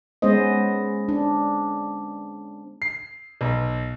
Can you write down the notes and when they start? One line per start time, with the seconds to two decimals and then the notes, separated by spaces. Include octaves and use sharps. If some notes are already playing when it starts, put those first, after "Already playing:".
0.22 G#3 B3 C#4 C5 D#5
1.09 D4
2.82 C7
3.41 B1